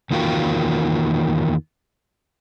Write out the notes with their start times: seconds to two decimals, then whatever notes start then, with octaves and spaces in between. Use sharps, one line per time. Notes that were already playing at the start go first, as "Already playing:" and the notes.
0.11 E2 D#3 A#3 F4 F#4 G5